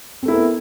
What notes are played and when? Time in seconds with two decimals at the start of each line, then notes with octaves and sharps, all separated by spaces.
0.23 C4
0.25 A3
0.28 E4
0.31 A#4
0.34 B3